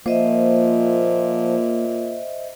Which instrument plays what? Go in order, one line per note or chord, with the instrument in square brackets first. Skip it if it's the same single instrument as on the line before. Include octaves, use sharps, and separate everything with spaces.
[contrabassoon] A#2 [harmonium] F3 [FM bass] A#3 [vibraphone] C5 D#5 E5